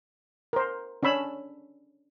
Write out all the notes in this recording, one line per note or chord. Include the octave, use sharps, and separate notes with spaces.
A#4 C5
C#4 D4 C#5 B5 E6